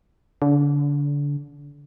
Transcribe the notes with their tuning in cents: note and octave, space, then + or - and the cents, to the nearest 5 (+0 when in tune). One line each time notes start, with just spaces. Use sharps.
D3 -30